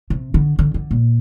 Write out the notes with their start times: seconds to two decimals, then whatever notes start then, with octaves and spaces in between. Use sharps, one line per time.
0.10 C3
0.34 D3
0.59 D3
0.74 D3
0.91 A#2